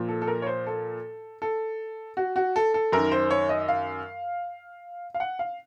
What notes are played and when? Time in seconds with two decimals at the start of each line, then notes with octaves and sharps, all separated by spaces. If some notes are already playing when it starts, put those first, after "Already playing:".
Already playing: A#2 F3
0.09 A4
0.22 A4
0.28 A#4
0.42 C#5
0.46 C5
0.67 A4
1.42 A4
2.17 F#4
2.36 F#4
2.56 A4
2.74 A4
2.92 F#2 D#3 A#4
3.12 C5
3.31 C#5
3.49 D#5
3.68 F5
5.14 F5
5.20 F#5
5.39 F5